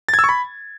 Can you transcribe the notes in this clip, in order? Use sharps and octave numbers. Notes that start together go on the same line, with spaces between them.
A6
G#6
E6
C#6
B5